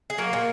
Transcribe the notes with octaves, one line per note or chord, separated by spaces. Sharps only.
G#4
F#3 A#3 A#4
A#2